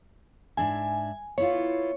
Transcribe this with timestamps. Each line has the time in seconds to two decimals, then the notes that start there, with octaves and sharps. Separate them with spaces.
0.57 G#2 D4 E5 G#5
1.38 B3 E4 F4 C#5